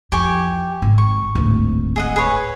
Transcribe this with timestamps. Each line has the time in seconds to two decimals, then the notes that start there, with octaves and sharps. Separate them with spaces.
0.12 F2 E3 G4 G#5 C#6
0.82 G#1
0.98 C#6
1.35 D1 G#1
1.96 G#4 D#5 F#5
2.16 G#4 B4 C#5